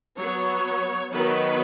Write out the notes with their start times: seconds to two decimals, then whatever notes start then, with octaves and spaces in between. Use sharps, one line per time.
0.18 F#3 B3 C#5
1.14 D#3 F#3 B3 B4